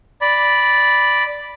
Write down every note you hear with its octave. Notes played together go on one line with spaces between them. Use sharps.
D5 B5